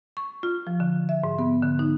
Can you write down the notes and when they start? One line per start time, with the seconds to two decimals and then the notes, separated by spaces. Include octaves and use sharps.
0.17 C#6
0.43 F4
0.67 F3
0.80 D3
1.09 E5
1.24 G#2
1.38 B3
1.63 D3
1.79 D#4